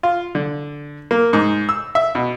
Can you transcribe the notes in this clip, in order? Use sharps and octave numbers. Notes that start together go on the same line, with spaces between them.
F4
D3
A#3
G#2
E6
E5
B2